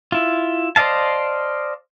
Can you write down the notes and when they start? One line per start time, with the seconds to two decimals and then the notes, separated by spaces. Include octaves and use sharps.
0.12 E4 F4
0.76 C5 D5 D#5 F5 A5